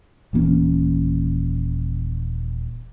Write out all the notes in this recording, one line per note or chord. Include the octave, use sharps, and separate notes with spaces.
D#1 E3 A#3 C#4